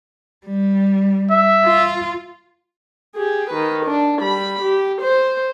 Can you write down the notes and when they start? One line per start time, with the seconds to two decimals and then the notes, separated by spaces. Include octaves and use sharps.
0.46 G3
1.31 E5
1.65 F4
3.16 G4 G#4
3.50 D#3 B4
3.86 D4
4.20 G3 B5
4.62 G4
5.02 C5